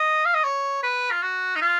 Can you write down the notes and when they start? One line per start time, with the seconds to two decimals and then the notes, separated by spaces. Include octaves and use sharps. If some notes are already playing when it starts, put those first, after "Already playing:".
Already playing: D#5
0.26 F5
0.34 D#5
0.45 C#5
0.83 B4
1.11 F4
1.22 F#4
1.56 D#4
1.61 F4